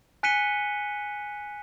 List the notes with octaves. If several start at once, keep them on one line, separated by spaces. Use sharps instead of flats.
G#5 F#6 B6 C#7 D#7 G7